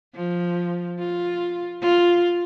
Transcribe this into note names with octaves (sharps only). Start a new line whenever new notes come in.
F3
F4
F4